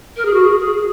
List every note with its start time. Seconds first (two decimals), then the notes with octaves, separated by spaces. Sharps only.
0.16 A#4
0.25 G#4
0.33 F#4
0.42 G#4
0.58 G#4